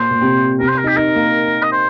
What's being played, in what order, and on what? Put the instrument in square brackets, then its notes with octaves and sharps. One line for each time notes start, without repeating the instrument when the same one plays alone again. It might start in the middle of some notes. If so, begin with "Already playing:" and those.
Already playing: [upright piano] A#2 [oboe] C5
[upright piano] A#2
C3
[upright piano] C3 [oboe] A#4
[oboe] C5
A#4
[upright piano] D#4
[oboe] G4
[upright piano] D#4 [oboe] A#4
[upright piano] A#3
[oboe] D#5
C5